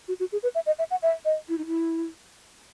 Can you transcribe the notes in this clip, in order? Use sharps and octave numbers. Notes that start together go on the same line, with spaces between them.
F#4
F#4
G#4
B4
E5
D#5
E5
F#5
E5
D#5
E4
D#4
E4